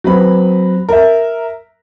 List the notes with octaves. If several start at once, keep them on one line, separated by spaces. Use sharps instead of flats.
F#3 C4 B4 B5
A#4 E5